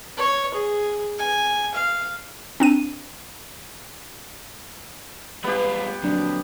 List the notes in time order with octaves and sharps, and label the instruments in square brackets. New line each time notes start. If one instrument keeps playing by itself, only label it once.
[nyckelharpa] C#5
G#4
G#5
F5
[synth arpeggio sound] C4 D4 D#7
[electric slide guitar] G3 G#3 F4 [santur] B3 G4
[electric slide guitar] F2 A#2 [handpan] F#3 D4